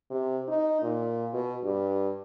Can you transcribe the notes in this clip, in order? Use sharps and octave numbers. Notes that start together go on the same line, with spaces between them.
C3
D#4
A#2
B2
G2